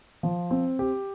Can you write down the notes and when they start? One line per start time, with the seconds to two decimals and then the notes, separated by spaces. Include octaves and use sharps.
0.23 F3
0.51 C4
0.79 G4